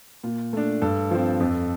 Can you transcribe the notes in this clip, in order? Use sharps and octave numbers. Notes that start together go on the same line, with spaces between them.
A#2
A3 D4
G2 A4
F3 C4
F2